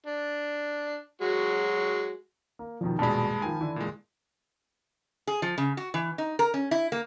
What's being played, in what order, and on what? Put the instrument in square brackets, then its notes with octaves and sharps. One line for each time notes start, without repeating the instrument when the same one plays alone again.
[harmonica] D4
F#3 G#3 F#4
[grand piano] A#3
[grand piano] E2 B2 D#3 [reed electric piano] F3
[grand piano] D#1 B2 D4 [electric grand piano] G2 G#3 [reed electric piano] A5 B5
[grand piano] D#3 F3 [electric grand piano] G#5
[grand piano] D3 E3
[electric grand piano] A#2 G#3
[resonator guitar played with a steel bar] G#4
F3
C#3
F#4
E3
D#4
A#4
C#4
E4
A#3